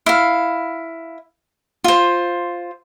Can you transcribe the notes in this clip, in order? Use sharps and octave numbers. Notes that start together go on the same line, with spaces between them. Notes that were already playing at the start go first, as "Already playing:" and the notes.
E4 F5
F4 C5